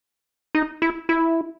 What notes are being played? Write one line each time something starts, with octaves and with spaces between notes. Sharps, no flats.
D#4
E4
E4